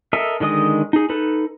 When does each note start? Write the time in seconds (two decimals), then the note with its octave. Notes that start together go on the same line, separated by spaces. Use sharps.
0.13 A4 A#4 D#5 E5
0.40 D3 D#3 G#3 D#5 D#6
0.93 D#4 G#4
1.09 D#4 A4 B4